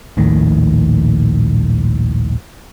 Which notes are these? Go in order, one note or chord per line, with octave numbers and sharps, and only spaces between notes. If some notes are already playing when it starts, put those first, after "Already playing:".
D#1 A#1 A2 D#3